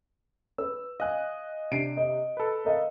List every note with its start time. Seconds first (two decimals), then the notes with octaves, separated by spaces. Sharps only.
0.58 B4 E6
1.00 D#5 F5 G#5 F#6
1.71 C3 D4 C7 D7
1.97 D#5
2.37 A4 B4
2.65 A#4 D#5 F5